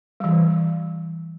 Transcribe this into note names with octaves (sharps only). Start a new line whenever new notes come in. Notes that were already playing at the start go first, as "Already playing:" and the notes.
E3 G3